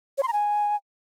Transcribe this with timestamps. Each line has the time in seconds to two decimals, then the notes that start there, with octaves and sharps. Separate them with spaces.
0.18 C#5
0.23 C6
0.28 A#5
0.33 G#5